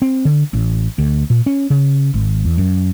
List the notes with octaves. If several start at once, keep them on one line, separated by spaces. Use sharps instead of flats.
C4
D3
A1
D2
A#2
C#4
C#3
G#1
E2
F#2